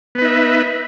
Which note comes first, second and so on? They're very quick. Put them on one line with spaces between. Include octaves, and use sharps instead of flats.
B3 B4 D#4 E5